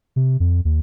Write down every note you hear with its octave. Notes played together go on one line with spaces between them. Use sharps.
C3
F2
D#2